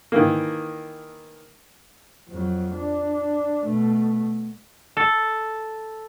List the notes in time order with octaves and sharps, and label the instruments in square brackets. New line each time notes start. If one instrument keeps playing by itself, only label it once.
[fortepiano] D#3 E3 A#3
[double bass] F2 F#3
D4
B2 A3
[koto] A4